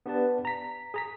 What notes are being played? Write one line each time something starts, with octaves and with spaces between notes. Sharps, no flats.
B3 D4 G4 B4 D5 A5
A#5 B6
G#4 A#5 B6